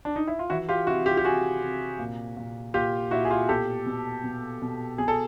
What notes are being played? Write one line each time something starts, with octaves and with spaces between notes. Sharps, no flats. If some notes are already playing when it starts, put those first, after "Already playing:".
D4
D#4
E4
F4
E3 E4 F#4
F4 G4
C3 E4 F#4
F4 G4
G4
C3 F#4 G#4
C3
A#2
A#2
A#2 F4 G4
A#2 E4 F#4
G#4
F4 G4
B2 G4 A4
B2
B2
B2
B2 G#4
A4